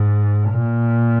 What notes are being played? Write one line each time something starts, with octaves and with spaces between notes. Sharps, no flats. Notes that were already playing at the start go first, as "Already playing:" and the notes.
Already playing: G#2
A#2